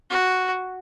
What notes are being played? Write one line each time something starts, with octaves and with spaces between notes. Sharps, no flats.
F#4